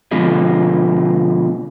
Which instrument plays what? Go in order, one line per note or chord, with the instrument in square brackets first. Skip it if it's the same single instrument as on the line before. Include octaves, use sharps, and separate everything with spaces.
[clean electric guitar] B2 D3 F3 G#3